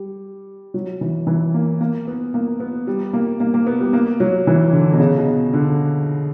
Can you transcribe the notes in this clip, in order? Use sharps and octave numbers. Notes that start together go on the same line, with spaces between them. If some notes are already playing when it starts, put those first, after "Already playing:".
Already playing: G3
F#3
E3
E3
A#3
A#3
B3
A#3
B3
G3
A#3
A#3
A#3
B3
G3
A#3
F#3
E3
D3
B2
C#3
B2
D3